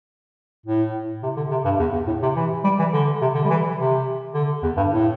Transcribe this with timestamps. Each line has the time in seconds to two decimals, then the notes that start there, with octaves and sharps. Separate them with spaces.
0.66 A2
1.23 C3
1.37 D3
1.51 C3
1.65 G2
1.80 E2
1.93 E2
2.07 A2
2.22 C3
2.36 E3
2.64 G3
2.79 E3
2.93 D3
3.22 C3
3.35 D3
3.44 G3
3.50 E3
3.78 C3
4.34 D3
4.63 E2
4.77 G2
4.91 A2